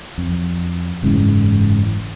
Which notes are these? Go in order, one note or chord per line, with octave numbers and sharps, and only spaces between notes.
F2
F#1 G#2 C#3 E3